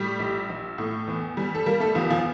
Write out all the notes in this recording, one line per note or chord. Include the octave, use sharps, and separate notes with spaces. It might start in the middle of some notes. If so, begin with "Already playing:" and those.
Already playing: A2 G3 G4
A#1
A#1
A2
E2
G3
A4
G3 A#3 A#4
A3 A4
E2 F3 F4
F3 F4